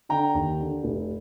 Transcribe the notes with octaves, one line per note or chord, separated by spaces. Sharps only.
D3 G5 A#5
D#2
D3
F1